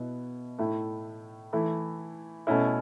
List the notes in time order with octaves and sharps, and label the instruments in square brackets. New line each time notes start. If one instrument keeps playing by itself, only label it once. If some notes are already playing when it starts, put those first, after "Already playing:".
Already playing: [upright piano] B2 B3 E4
A2 A3 E4
E3 A3 E4
B2 A3 C#4 E4